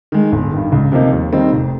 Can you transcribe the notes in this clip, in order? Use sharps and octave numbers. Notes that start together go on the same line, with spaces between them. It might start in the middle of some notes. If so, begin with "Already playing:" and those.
D#3 G#3
G1
G2 D#3
C#2
C3 F3 A#3 D#4
D#2
D#3 G3 C4 D#4
F1